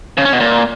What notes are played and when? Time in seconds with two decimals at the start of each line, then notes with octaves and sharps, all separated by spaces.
0.18 C#3
0.25 C#4
0.33 B2
0.40 A#2